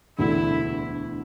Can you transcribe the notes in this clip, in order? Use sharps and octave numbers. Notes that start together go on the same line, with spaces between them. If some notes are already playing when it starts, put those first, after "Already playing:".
E1 D2 D3 A3 E4